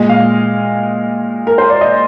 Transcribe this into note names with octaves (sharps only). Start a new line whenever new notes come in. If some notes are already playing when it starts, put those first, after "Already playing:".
Already playing: A#2 G#3 D#5
F5
A#4
C5
D5
D#5